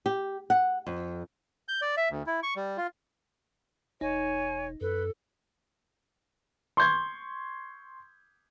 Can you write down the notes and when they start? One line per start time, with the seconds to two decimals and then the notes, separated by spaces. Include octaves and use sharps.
0.06 G4
0.50 F#5
0.87 F2
1.68 G6
1.82 D5
1.97 E5
2.10 D2
2.27 E4
2.43 C#6
2.56 G3
2.77 F4
4.01 E1 D#4 C#5 G#5
4.81 F#2 A4 B4
6.77 C6 C#6 G6 G#6